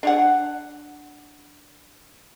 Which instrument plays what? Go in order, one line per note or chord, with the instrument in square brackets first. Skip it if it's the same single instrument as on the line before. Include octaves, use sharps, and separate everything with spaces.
[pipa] D4 C#5 F#5